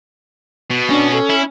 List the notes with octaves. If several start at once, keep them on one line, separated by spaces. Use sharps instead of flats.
B2
C#4 D4
A4
E4